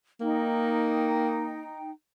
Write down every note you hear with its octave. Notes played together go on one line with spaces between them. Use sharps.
A#3 D#4 G5